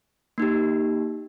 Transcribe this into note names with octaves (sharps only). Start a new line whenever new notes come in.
A#3 D#4 G4